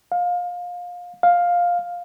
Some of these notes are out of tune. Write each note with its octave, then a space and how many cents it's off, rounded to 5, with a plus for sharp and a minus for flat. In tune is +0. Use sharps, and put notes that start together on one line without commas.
F5 +25
F5 +10